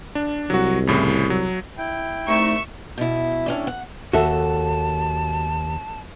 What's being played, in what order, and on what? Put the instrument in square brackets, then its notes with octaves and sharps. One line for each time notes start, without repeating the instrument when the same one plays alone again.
[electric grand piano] D4
[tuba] C2 [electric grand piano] F#3 F#4
[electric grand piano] F2 A2 C#3
F#3
[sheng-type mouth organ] E4 G5
[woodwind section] C2 A3 D#4 [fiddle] E5 C#6
[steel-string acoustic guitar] B2 E4
A2 C#4 D4
F#5
[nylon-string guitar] D#2 A4 [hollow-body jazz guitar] F#4 E5 [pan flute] A5